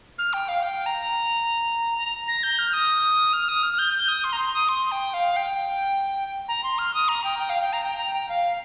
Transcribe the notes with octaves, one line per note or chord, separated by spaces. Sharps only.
F6
G5
F5
G5
A#5
A#5
A#6
G6
F6
D#6
F6
D#6
F6
G6
G6
D#6
C6
A#5
C6
D#6
C6
G5
F5
G5
A#5
C6
F6
D#6
A#5
G5
G5
F5
G5
A#5
G5
A#5
G5
F5